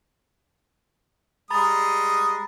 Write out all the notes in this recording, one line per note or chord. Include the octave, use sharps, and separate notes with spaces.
G3 G#3 A#5 B5 D#6 A6